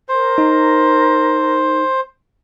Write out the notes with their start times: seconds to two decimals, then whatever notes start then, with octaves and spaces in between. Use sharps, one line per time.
0.09 A#4 C5
0.38 D#4